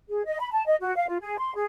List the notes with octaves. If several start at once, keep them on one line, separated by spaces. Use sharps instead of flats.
G#4
D#5
B5
A5
D#5
F#4
F5
F4
G#4
C6
G#4